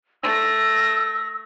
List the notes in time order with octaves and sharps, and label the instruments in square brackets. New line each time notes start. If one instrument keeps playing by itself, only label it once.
[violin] A3 A#6 [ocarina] E6